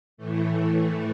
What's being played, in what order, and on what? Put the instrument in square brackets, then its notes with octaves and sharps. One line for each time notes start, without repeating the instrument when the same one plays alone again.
[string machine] A2 E3 A3